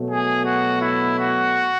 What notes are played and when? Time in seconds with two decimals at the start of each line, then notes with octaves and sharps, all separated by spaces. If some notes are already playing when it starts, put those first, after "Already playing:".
Already playing: B2 F#3 A3
0.09 G#4
0.44 F#4
0.80 E4
1.16 F#4